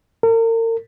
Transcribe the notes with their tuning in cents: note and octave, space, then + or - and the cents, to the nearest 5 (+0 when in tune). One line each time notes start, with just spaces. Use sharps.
A#4 -40